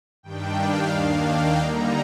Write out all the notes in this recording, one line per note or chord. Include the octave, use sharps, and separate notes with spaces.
G2 D#3 G3 D4 G5
F5
D#2 D#3 A#3 D4
G5
D3 G3 A#3 D#4 A#5